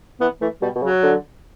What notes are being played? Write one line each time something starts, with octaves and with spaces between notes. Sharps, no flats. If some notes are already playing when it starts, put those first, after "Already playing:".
E3 B3
E3 A3
B2 G3
B2
C#3 F#3
D3